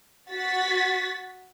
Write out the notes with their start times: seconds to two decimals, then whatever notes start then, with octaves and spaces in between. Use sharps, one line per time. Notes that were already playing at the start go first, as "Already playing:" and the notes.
0.29 F#4 A6 B6